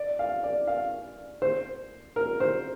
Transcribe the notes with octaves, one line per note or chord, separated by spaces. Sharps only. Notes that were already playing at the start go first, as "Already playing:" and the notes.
Already playing: D5
F5
D5
F5
C5
A#4
C5